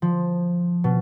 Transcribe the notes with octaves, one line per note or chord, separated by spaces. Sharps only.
F3
B2